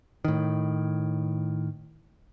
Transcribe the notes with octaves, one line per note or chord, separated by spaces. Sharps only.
A2 D#3